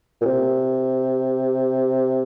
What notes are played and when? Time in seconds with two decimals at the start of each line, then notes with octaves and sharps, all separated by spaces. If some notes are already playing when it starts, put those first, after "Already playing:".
0.21 A#2
0.25 C3